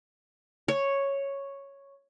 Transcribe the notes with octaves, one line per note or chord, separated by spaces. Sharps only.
C#5